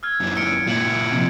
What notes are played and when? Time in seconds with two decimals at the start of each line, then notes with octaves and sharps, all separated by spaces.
0.03 E6 F6 G#6
0.20 F#2 E3
0.36 E6 C#7 D7
0.67 A#2 E4 G#6 F#7
1.12 C3 F3